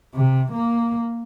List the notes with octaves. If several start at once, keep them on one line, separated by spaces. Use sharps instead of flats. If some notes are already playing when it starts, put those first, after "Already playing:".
C3
A#3